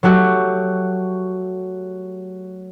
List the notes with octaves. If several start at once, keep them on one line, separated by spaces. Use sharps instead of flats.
F#3 A3 F#4 G4